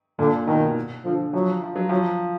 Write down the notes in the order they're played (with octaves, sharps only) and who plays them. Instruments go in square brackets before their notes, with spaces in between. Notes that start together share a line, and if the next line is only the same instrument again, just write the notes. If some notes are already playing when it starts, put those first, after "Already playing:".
[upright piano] A#2 [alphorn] D3
[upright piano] B2 [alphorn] D#3
[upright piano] D3 [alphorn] F3
[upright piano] F3 [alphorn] F#3
[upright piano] F3
F#3
[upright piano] F3 [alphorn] F#3